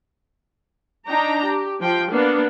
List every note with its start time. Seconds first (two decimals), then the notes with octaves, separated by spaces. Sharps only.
1.07 D4 D#4 G5 A#5
1.45 G4
1.80 F3 G5
2.11 A#3 B3 D4